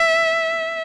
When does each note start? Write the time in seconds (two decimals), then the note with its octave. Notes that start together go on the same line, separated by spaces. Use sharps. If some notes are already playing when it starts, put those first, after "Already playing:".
Already playing: E5